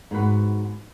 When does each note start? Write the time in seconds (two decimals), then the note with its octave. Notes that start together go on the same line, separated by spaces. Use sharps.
0.11 G#2 B3 F#4 B4